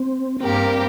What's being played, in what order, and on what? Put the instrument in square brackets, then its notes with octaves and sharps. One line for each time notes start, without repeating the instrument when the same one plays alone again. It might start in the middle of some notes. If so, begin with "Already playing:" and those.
Already playing: [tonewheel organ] C4
[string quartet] G2 G3 A#3 G4 A#4 [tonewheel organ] C4